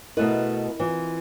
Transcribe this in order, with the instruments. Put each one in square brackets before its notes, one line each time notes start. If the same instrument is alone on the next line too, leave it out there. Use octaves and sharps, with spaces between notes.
[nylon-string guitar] B2 A3 B4 [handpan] E4 A#4 D#5
[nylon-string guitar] E3 [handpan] C4 F4